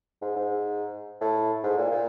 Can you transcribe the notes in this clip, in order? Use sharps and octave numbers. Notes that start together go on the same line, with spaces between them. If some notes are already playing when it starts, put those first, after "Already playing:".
G#2
G#2
A2
G#2
A#2
A#2